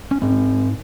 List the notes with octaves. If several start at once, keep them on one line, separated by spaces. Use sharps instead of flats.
C#4
G#2 C4